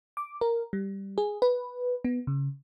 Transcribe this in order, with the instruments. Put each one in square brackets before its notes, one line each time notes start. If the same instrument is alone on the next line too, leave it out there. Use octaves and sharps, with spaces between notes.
[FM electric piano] D6
A#4
G3
G#4
B4
B3
C#3